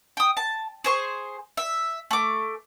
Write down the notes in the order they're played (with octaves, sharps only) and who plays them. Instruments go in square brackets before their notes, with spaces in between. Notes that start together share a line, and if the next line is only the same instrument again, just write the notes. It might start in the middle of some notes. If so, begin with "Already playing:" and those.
[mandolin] G5 D#6
A5
G#4 C5 C#6
E5
A3 D6